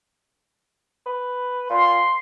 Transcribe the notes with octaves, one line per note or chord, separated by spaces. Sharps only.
B4
A#2 C6